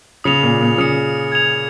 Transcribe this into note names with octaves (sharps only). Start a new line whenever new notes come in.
C#3 D#6 C#7 F7
A#2
A#2
C#3 D#6 C#7 F7
G#6 F7